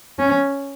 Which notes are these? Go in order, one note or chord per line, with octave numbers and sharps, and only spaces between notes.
C#4